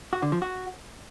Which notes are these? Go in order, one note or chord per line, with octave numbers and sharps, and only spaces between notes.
F#4
D3
F3
F#4